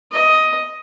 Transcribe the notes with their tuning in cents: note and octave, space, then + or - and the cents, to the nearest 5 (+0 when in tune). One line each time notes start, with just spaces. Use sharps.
D#5 +10